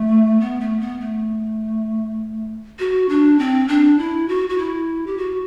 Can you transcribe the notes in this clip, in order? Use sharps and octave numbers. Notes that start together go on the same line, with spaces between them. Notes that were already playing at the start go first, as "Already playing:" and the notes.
Already playing: A3
B3
A3
B3
A3
F#4
D4
C4
D4
E4
F#4
F#4
E4
G4
F#4